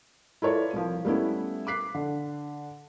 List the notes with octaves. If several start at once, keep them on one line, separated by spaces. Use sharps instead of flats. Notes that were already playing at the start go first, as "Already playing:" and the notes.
E4 F4 A4 B4 C#5 D5
C2 F3
G3 A3 B3 C#4 E4
D6 F#6 B6 C7
D3